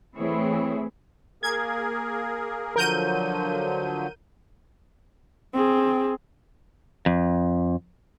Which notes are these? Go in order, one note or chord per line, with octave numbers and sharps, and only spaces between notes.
E3 A3 C4 E4 G#4 C#5
A#3 G#4 A#4 G#6
D3 F3 F#3 A#4 G6 D#7
C4 G#4
F2